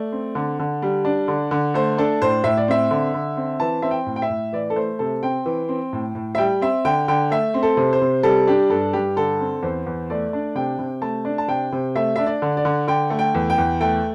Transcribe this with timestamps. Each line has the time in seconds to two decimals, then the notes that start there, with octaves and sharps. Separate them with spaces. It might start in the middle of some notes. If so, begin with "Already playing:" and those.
Already playing: A3 D5
0.12 C4
0.35 D3
0.59 D3
0.82 G3
1.05 D4
1.28 D3
1.51 D3
1.74 A3 C5
1.98 D4 A4
2.22 A2 C5
2.44 A2 E5
2.57 D5
2.68 C4 E5
2.91 D3
3.14 D3
3.37 C4
3.60 E3 A5
3.82 C4 E5
3.91 G5
4.06 A2
4.16 G5
4.22 E5
4.30 A2
4.53 E3 D5
4.70 A4
4.76 A3 C5
4.99 C3 A4
5.23 C4 G5
5.46 E3
5.69 C4
5.93 A2
6.15 A2
6.35 E5
6.38 G3 G5
6.61 C4 E5
6.85 D3 G5
7.08 D3 G5
7.31 A3 E5
7.54 C4
7.63 A4
7.77 C3
7.93 C5
8.01 C3
8.23 G3 A4
8.47 D4 G4
8.70 G2 A4
8.93 G2 G4
9.16 D3 A4
9.40 C4
9.62 E2 C5
9.86 E2
10.10 A3 D5
10.33 D4
10.55 C3 G5
10.79 C3
11.02 A3 A5
11.25 D4
11.38 A5
11.48 C3 G5
11.72 C3
11.96 A3 E5
12.16 D4 E5
12.26 D5
12.42 D3
12.57 D5
12.65 D3
12.88 D3 G5
13.10 A3
13.19 G5
13.35 E2
13.50 G5
13.58 E2
13.81 A3 G5